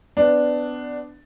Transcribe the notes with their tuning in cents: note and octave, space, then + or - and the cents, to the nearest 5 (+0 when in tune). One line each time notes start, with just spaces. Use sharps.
B3 +25 D4 +0